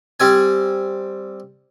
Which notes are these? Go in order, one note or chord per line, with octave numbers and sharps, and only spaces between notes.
G3 C4 G#5